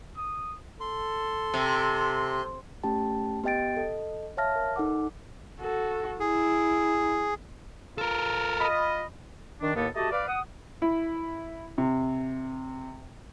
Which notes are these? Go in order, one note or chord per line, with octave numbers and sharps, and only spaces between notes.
D#6
A4 C6
C3
A3 C#4 G4 G5 A5
B3 G4 D#5 G5 A6 D7
A4 D#5
C#5 E5 F5 A5 F6 A#6
A#4
D#4 A4 F#5 D6
F#4 A4
E4 G#4
F4 A4 A#4
D#5 B5
D#3 D4
D#2 A2 A#3 B3 A4 A#4
A3 F#4 G4 D#5 A5
B4 D5 F5
F#5 D#6
E4
C3